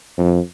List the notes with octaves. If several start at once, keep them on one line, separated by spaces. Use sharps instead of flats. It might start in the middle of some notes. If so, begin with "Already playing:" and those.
F2